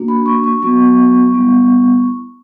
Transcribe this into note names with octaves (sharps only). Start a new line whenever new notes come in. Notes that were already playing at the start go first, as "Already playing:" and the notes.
Already playing: A#3 D4 F#4
B5
C#6
C#6
F#3 B3 F#4 C#6
G3 B3 E4